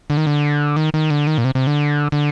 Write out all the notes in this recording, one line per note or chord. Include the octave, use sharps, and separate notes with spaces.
D3
D#3
D3
D#3
D#3
D3
D#3
A#2
C3
C3
D3
D3